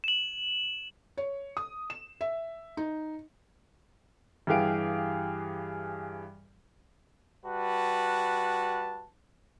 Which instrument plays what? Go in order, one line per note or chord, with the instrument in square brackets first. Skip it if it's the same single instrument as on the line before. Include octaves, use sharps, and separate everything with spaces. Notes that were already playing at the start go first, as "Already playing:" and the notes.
[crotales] E7 F#7
[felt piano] C#5
D#6
E7
E5
D#4
[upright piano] G2 E3 G4 G#4 F5 D7
[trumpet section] G3 F#4 B4 A5